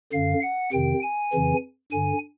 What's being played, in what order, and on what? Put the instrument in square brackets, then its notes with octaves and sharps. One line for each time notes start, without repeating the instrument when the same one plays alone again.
[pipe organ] F#2 D3 F5
F#5
F2 C3 D#3 G5
G#5
F2 C#3 E3
G2 D3 G#5